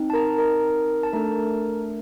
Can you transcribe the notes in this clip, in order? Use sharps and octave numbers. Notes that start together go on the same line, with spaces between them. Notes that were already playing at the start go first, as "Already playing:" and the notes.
Already playing: C4 D#4
A5
A#4 A#5
A#4 A#5
A5
A3 D4 A4 A#4 A#5